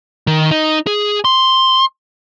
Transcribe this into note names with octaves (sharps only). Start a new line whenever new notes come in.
D#3
D#4
G#4
C6